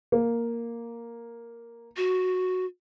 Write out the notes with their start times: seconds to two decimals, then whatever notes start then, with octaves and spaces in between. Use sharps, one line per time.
0.12 A#3
1.97 F#4